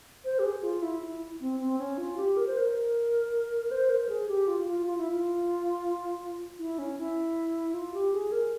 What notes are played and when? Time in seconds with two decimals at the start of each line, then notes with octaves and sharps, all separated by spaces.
0.25 C5
0.39 G4
0.44 G#4
0.63 F4
0.82 E4
1.02 E4
1.41 C4
1.60 C4
1.79 C#4
1.98 F4
2.17 G4
2.37 A#4
2.47 C5
2.57 A#4
3.71 C5
3.90 A#4
4.09 G#4
4.28 G4
4.48 F4
4.68 F4
4.87 F4
4.98 E4
5.09 F4
6.59 E4
6.79 C#4
6.98 E4
7.74 F4
7.94 G4
8.13 G#4
8.32 A#4